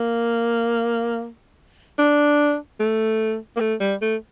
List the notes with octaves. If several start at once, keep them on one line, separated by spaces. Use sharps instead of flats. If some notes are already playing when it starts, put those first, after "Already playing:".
Already playing: A#3
D4
A3
A#3
A3
G3
A3